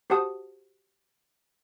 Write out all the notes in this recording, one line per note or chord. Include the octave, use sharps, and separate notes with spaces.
F#4 G4 C5 F#5 A5 D#6